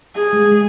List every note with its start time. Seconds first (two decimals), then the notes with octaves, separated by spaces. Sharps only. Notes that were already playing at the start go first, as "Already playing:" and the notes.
0.16 G#4
0.33 G#3
0.51 G#3